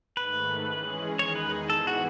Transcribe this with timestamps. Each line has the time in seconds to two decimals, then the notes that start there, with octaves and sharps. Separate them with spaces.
0.17 G#2 D#3 A3 B4
0.68 E3 G#3 C#4 G#4
1.18 E2 D#3 G#3 D#4 G#4 C#5
1.36 B4
1.70 G#2 E3 B3 E4 G#4 A4
1.87 F#4